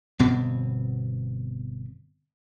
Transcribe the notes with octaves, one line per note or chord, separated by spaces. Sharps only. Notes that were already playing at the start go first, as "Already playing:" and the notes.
G1 B2 B3 C4